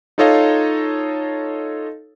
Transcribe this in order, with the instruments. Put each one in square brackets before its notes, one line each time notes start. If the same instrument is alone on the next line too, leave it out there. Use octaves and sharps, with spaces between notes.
[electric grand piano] D#4 F4 A4 C#5 D#5 F5